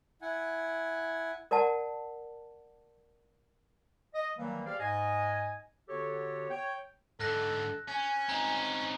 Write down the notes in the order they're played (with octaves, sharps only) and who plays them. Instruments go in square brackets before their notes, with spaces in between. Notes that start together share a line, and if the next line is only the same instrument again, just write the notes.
[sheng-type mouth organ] E4 F#5 G#5
[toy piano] A#4 D5 F#5 A5
[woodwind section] D#5
D#3 E3 F#3 G3 A#3
G4 G#4 C5 D5 F5
G#2 D#5 G#5
D3 B3 F#4 G4 A4 C#5
C#5 G5
[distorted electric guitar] G#2 D3 [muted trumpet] A4 [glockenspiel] F6 F#6 A#6
[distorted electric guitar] C#4 [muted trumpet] G#5
[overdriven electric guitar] C4 D#4 [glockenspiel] A#5